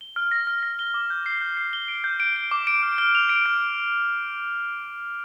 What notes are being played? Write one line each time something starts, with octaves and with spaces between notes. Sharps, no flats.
G7
F6
A#6
F6
A#6
G7
D6
G6
C7
G6
C7
G7
D7
G6
D7
D7
D6
D7
F6
F6
F7
D7
F6